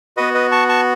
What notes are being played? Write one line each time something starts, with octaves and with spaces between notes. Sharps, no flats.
B3 F#4 B4 D#5
B4 D#5
A5 C#6
A5 C#6